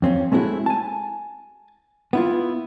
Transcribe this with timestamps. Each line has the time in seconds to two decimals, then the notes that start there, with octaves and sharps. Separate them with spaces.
0.02 F2 C4 C#4
0.32 G#3 A3 C4 E4 F#4 G#4
0.66 G#5 A5
2.13 B3 E4 F4